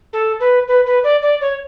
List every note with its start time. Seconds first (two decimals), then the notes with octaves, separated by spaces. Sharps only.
0.13 A4
0.40 B4
0.68 B4
0.86 B4
1.04 D5
1.22 D5
1.41 C#5